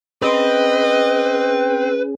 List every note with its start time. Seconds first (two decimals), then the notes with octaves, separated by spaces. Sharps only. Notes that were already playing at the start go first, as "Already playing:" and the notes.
0.22 C4 C#4 G#4 B4 D#5